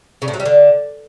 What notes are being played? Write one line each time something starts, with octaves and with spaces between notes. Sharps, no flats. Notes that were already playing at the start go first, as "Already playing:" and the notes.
C#3
A2
F#3
G3
D3